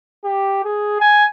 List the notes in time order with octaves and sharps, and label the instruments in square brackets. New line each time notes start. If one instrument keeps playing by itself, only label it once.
[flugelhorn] G4
G#4
G#5